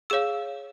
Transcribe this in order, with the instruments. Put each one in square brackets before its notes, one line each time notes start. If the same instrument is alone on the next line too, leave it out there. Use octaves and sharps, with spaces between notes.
[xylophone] G#4 C#5 F5 E6